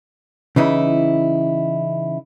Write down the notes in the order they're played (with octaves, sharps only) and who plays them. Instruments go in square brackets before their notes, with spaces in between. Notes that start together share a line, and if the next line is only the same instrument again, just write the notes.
[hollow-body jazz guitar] C#3 E3 D#4 E4